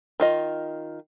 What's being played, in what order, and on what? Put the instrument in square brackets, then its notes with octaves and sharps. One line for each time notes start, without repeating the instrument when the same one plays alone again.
[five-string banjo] D#3 F4 D#5